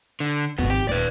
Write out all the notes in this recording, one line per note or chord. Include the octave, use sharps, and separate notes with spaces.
D3
G#1 F2 B2 B3
G4
D#1 B4 D5